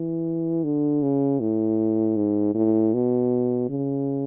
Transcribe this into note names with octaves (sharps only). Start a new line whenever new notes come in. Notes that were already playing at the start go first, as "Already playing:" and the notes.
Already playing: E3
D3
C#3
A2
G#2
A2
B2
C#3